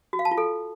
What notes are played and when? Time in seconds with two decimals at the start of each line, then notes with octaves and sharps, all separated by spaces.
0.13 F#4
0.19 F5
0.25 A5
0.31 F4
0.38 A4